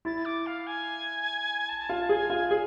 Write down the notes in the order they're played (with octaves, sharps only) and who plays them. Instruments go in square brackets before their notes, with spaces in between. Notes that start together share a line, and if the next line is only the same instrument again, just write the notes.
[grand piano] E4 [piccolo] A6
[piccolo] D6
F5
G#5
A5
[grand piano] F4
[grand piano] G#4 [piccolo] G#5
[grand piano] F4
G#4